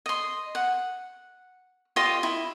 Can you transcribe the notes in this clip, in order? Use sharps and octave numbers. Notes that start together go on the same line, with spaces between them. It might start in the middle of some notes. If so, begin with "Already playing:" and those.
D#5 C6
F#5
F4 G4 D#5 C6
E4